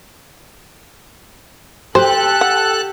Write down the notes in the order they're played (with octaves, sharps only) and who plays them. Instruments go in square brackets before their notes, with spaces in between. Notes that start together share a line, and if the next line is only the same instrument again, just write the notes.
[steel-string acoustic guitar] G4 [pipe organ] A4 F#6 [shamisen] C5 [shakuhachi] G5
[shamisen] F#5